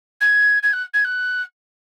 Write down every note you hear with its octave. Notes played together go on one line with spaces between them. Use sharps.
G#6
G#6
F#6
G#6
F#6